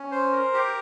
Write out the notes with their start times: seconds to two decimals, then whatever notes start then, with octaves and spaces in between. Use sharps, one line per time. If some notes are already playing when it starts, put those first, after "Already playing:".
Already playing: C#4
0.11 C5
0.32 A#4
0.54 G4